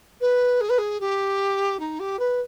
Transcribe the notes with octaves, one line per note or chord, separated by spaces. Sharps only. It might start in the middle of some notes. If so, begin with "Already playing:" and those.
B4
G#4
B4
G#4
G4
D#4
G4
B4